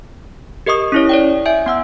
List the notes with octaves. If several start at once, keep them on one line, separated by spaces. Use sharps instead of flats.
G4 A#4 D#5 C#6 D#6
C#4 E4 C#5
C#5 D5 G5
E5 G#5 G6 D7
B3 F#5 E6